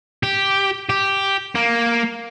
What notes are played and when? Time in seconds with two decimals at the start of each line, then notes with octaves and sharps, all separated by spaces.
0.23 G4
0.90 G4
1.55 A#3